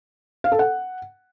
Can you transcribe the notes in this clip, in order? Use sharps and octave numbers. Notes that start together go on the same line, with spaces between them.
F5
A4
F#5